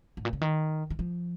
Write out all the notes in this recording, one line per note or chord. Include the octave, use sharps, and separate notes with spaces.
G#2
A#2
C#3
D#3
D#3
F3